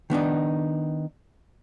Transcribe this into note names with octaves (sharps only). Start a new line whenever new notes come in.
D#3 B3 D4 D#4